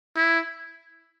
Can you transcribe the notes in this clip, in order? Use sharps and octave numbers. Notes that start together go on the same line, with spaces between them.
E4